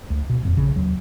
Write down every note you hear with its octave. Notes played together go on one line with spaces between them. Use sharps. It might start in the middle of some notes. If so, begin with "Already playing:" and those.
D2
B2
D#1 F2
A#1 C#3
D#2 F#3